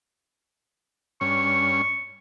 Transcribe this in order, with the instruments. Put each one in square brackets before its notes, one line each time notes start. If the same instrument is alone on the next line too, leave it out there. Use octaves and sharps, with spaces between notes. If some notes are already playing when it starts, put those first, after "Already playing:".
[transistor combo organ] G2 C#4 [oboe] C#6